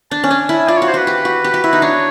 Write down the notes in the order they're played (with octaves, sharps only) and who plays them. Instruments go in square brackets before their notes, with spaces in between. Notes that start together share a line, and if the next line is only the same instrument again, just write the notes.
[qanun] D4 [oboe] A5
[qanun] C#4
[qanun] D4 [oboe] G#5
[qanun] E4
[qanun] F4 [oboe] D5
[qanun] F#4 [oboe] C#5
[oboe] C5
[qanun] F#4 [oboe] B4
[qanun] G4
F#4
G4
F#4
E4
D#4
[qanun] D4 [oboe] C#5